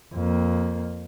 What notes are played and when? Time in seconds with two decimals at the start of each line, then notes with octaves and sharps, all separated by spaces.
0.14 F2 A#3